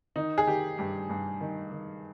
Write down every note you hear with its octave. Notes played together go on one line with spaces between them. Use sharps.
D#3 D#4
G#4
D#3 G4
G2 G4
G2
D#3
D#3